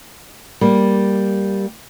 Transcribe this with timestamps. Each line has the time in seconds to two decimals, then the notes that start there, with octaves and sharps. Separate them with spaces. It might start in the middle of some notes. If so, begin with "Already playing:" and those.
0.61 G3 A#3